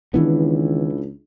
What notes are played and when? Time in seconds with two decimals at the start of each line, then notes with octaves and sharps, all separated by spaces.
0.14 C#2 D#3 E3 B3 D4 E4